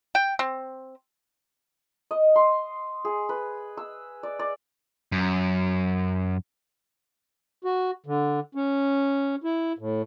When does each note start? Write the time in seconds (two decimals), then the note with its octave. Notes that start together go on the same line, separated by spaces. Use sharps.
0.15 G5
0.39 C4
2.11 D#5
2.36 C6
3.05 G#4
3.29 B4
3.77 E6
4.23 D5
4.39 D5
5.12 F#2
7.64 F#4
8.06 D3
8.55 C#4
9.44 E4
9.79 A2